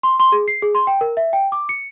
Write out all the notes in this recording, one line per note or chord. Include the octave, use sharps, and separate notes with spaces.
C6
C6
G#4
C7
G#4
C6
G5
A#4
E5
G5
D6
C#7